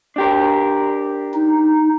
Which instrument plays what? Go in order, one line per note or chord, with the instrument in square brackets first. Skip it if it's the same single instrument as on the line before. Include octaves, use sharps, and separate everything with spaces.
[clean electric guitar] D4 G4 A#4
[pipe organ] D#4